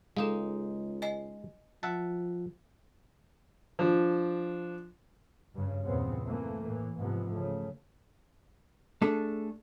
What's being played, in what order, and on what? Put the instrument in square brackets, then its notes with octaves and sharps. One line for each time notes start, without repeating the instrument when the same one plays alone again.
[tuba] C#2 [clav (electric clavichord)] G#3 D#4 [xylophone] A4 F5
[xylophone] D#5 G#5 C7
[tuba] F3 [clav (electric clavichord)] E5 F#5 A5
[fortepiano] F3 D4
[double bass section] G2 C#3
E2 A#2 C#3 E3 B3 C4
E3 A3 A#3
A2 E3
G#2 C3 E3 F3 B3
C#3 A3
[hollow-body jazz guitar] A3 D4 G#4 A4